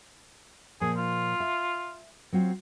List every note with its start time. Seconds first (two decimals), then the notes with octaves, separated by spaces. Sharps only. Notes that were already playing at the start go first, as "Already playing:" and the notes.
0.81 A#2 F3 G#4
0.97 F4
1.40 E5
2.33 F#3 C4 F4